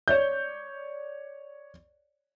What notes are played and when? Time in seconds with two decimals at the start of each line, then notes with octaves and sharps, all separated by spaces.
0.08 C#5 D5 G6